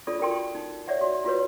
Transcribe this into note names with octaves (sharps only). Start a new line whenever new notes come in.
D4 F4 A4 D5
F4 F#4 A#4 G5 G#5 C6
D#4
C#5 D5 E5 F#5
F#4
F4 F#4 B4 C#5